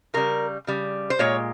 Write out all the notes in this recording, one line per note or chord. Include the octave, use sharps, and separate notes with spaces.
C#3 G3 A#4
C#3 G3
C5
A#2 G#3 C#5